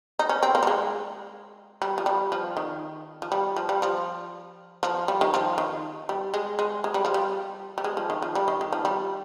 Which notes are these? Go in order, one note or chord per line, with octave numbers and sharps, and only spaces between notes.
D#4
C#4
C4
A#3
G3
G#3
G3
F3
G3
F3
D#3
F3
G3
F3
G3
F3
F3
G3
D#3
F3
D#3
G3
G#3
G#3
G#3
G3
F3
G3
G3
G#3
F3
D#3
F3
G3
D#3
D#3
F3
G3